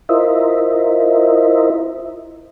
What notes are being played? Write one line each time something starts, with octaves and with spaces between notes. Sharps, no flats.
E4 F4 A#4 C5 D#5 E5